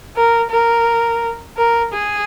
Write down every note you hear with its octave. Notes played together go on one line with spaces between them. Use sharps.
A#4
A#4
A#4
G#4